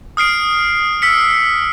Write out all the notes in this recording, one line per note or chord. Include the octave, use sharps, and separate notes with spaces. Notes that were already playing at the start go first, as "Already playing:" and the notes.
D#6 F6 C7 D7
E6 B6 C#7